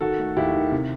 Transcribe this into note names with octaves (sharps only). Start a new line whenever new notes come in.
D#3 F#4 A4
A3
D#2 E4 G4
D#3
C3